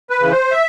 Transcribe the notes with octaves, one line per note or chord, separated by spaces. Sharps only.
B4
C#3 E3
C5
E5